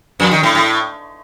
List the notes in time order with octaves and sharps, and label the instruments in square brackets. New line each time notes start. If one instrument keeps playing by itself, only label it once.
[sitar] F2
D#3
A2
A2